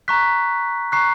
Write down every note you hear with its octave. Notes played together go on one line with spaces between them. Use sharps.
A#5 C#6 F#6 B6
A#5 C#6 F#6 C7